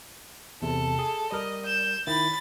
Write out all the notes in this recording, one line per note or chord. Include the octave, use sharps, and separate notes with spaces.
E2 C3 A4
G#4
G3 A#4 D#5
G6 E7
D#3 E4 B5 A6